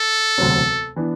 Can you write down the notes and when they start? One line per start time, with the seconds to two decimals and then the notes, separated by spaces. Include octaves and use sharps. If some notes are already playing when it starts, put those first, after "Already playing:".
Already playing: A4
0.38 E1 D2 C3 F#3 C4
0.96 E3 B3 D4